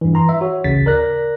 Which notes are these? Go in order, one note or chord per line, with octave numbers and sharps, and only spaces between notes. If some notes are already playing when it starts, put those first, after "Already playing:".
G2 E3
E3 A#5 C6
E5
F#4 C#5
A1 D2 C#3 A6 B6
A#4 D5 F#6 A#6